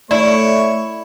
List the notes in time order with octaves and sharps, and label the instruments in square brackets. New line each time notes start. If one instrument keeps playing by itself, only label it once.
[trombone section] A3 [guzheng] E4 [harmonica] C#5 [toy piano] D5